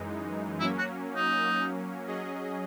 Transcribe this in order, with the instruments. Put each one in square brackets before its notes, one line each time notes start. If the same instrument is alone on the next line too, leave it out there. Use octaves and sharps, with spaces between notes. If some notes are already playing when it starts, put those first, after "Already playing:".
Already playing: [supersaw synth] F#2 E3 G#3 D#4
[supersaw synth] F#3 A#3 C#4 [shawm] E4
[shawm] F#4
D#4
[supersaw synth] F#3 C#4 G#4 D#5